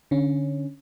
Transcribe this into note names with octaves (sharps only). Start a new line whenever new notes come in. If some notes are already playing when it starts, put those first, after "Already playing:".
D3 C#4